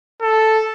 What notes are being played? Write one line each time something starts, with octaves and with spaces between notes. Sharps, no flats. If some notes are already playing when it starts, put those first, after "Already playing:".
A4